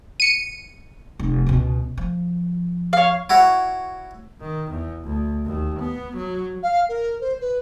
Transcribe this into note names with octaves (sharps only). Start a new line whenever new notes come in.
C#7 D#7
F1
C#2 B2
F3
C#5 F5
E4 F#4 C#5
D#3
E2
D2
D#2
B3
F#3
F5
A#4
C5
B4